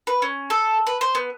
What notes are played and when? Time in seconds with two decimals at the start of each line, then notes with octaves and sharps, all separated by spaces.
0.07 B4
0.22 C#4
0.50 A4
0.87 B4
1.01 C5
1.15 B3